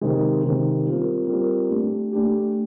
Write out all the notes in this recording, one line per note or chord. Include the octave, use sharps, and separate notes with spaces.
C3 D#3 G#3
C3 D#3 G#3
G3 C4 F4 A#4
G3 C4 F4 A#4
A3 D4 G4
A3 D4 G4